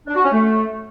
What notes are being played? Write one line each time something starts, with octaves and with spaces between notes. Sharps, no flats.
D4
F#4
C#4
A3